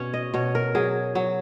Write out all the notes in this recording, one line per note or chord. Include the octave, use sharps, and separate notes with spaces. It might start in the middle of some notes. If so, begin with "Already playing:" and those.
Already playing: B2 C#4 C#5
D#5
B2 C#5
A#4
F#3 G#4
F#3